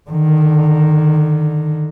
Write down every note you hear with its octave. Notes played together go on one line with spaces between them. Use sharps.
D3 D#3